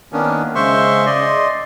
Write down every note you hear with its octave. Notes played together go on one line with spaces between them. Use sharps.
D#3 A#3 B3 C#4 D4
C#3 G#3 C5 E5 C6 C#6
D5 D#5 C6